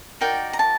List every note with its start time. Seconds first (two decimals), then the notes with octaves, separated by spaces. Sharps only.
0.21 D#4 F#4 A#4 D5 G5
0.53 A#5
0.59 A5